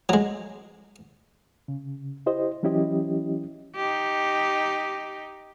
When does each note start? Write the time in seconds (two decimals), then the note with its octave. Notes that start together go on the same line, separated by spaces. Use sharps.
0.09 F#3 G#3
1.68 C#3
2.26 E4 G4 C5 D#5
2.63 E3 F#3 C#4 E4 G4 D#5
3.75 D#4 G4